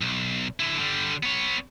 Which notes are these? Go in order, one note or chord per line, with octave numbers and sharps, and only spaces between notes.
B1
D3 E4
D3 G3
B3 C#5